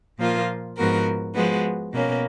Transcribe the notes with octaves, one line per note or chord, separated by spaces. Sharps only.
A#2 F3 A#3 F4
G#2 F3 B3 F#4 A#4
F3 G#3 B3 F#4
B2 A#3 C#4